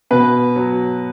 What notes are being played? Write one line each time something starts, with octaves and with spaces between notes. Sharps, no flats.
B2 B4
F#3